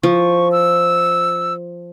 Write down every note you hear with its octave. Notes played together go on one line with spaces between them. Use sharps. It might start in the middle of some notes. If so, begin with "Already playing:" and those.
F3 C#6
E6